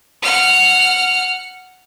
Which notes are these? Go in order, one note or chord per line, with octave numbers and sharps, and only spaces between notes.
F#5 F6